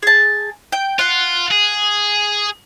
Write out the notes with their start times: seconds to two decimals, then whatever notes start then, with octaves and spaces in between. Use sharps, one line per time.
0.03 G#4 A5
0.72 G5
0.99 F4 F#5
1.51 G#4